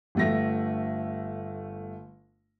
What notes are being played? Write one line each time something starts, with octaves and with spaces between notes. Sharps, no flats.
G1 A3 A#6